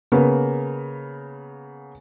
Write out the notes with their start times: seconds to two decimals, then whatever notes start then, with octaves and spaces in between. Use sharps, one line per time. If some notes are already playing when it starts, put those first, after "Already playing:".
0.12 C#3 A#3 B3